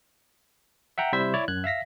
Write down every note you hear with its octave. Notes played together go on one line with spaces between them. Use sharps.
E5 F#5 G5 A#5
C3 G3 E4 C5 E5 B6
E4 C#5 D5
F#2 F#6 G#6
E5 F5 A#6 B6